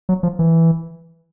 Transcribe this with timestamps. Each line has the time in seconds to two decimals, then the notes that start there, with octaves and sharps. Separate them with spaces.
0.09 F#3
0.23 F3
0.39 E3